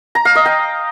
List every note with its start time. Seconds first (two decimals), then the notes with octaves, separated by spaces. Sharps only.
0.15 A#5
0.25 F5
0.35 D#5
0.45 G5